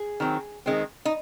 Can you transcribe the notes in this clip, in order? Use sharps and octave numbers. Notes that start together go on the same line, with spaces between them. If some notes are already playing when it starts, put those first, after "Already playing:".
Already playing: G#4
D#3 F#3 C4
D#3 G#3 C4
D#4